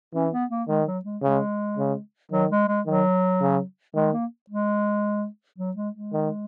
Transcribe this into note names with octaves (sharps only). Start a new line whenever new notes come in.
E3 C#4
B3
A#3
D#3 G#3
F#3
G#3
C#3 G#3
C#3
D#3 F#3
G#3
G#3
D#3 F#3
C#3
D#3 G#3
A#3
G#3
F#3
G#3
G#3
D#3